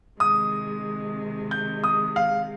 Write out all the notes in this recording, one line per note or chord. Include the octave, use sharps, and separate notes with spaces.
C3 D#3 G#3 D#6
G6
D#6
F5